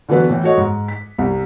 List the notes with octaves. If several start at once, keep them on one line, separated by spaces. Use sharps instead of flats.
D3 E3 F#3 B3 B4
A2 E3
F#4 A4 C#5 D#5 F#5
G#2
B6
C2